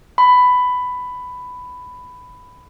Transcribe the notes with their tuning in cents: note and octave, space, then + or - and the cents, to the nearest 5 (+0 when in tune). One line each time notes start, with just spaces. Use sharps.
B5 +10